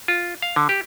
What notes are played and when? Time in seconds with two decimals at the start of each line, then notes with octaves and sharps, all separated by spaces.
0.08 F4
0.42 F5
0.56 D3
0.69 G4